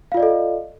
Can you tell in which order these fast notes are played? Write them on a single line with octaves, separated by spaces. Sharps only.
F5 F4 D5 D#5 A4